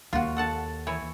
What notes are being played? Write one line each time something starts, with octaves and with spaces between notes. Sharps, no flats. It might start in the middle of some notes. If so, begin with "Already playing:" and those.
D#2 F4 F#4
A4 F#5 A5
E3 E4 C#5